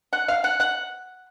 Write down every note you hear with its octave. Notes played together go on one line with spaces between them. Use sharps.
F#5
F5
F#5
F#5